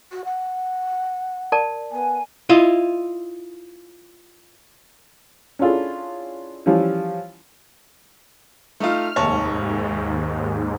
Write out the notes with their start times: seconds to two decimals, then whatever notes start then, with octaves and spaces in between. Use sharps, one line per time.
0.11 F#4
0.24 F#5
1.52 A#4 D5 A5
1.91 B3 G#5
2.49 E4 F4 D#5
5.59 C#4 D4 E4 F4 G#4 A4
6.66 E3 F3 G3 C#4
8.80 A3 D#4 F4 F6
9.16 F1 D#2 G#2 C#5 A5